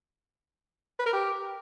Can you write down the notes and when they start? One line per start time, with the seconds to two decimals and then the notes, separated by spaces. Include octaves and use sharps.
0.99 B4
1.06 A#4
1.13 G4